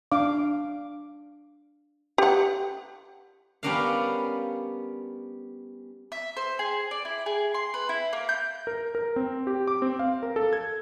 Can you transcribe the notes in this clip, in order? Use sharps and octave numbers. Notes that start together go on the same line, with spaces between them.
D4 F5 D6
G4 F#5
G3 B3 C#4 D4 A#4 F5
E5
C5
G#4
D5
E4
G#4
C6
B4
E4
A#3
G6
A#4
A#4
C4
G4
D6
C4
F5
A#4
A4
G#6